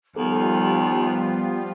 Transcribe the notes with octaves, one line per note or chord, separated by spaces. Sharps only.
D#2 F3 G3 B3 F4 A4